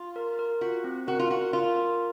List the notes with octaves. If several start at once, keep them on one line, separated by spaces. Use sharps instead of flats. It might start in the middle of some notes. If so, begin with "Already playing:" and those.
Already playing: F4
A#4
A#4
F4 F#4
C4
F#4 A#4
F4
F#4 A#4
F4 A#4
A#4